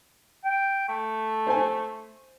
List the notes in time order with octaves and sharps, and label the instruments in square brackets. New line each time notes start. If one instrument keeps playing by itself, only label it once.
[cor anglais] G5
A3
[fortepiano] C5 G#5